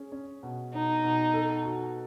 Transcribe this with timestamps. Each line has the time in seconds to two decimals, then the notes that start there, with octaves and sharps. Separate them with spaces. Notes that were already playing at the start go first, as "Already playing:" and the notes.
Already playing: C#4 G#4
0.12 C#4
0.43 B2
0.73 B2 D#4
1.04 B2
1.34 A4
1.65 F#4